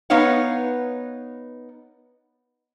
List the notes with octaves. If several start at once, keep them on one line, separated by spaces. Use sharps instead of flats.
B3 D#4 B4 C#5 F5 F#5